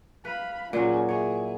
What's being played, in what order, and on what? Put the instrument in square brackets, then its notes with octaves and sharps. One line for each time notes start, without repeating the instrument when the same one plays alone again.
[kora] B4 [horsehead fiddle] F5 B5
[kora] A#2 F#3 [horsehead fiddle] C#4 G#4
[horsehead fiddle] E4 G#4 [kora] C#5